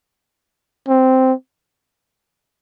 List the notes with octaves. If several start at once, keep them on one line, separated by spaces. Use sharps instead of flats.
C4